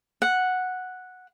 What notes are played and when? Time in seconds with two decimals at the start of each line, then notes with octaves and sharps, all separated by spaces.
0.22 F#5